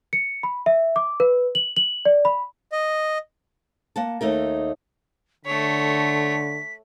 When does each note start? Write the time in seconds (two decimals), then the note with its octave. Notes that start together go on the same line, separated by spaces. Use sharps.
0.13 C#7
0.43 B5
0.66 E5
0.96 D6
1.20 B4
1.55 F#7
1.77 F#7
2.05 D5
2.25 B5
2.72 D#5
3.96 A#3 F#5 A5
4.21 D#2 A3 D#4 A#4
5.45 D3 A3 C#5 B6